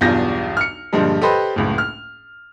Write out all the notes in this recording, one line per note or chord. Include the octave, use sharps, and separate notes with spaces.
B1 E2 G2 F4 G6 A#6
F6 C#7
G2 A#2 D3 F3 G3 G#3
G4 A4 B4 C5 D#5 B5
F#1 C#2 A2
F6